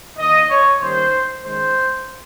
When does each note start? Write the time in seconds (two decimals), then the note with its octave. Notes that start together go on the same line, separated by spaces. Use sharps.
0.18 D#3 A#3 D#4 D#5
0.49 C#5
0.80 D#3 G3 A#3 C#4 C5
1.42 D#3 G#3 C#4 C5